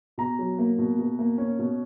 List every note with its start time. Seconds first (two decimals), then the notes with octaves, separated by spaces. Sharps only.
0.18 B2 A#5
0.39 F#3
0.59 A#3
0.78 B2
0.99 B2
1.19 A#3
1.38 C#4
1.59 B2